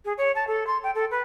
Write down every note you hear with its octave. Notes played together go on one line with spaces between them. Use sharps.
G#4
C#5
A5
A4
C6
G5
A4
B4